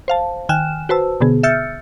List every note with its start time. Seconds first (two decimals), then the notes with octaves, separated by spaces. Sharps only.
0.08 C5 F5 A5
0.49 D#3 G5 G#5 F6 F#6 E7
0.89 F#4 B4 C5 A5 E6
1.21 B2 D3 B3 G#4
1.43 E5 E6 F6 G6 A6 C#7